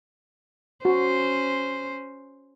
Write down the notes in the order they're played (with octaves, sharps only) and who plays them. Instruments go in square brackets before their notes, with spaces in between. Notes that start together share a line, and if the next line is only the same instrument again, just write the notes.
[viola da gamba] C#4 C5 [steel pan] F#4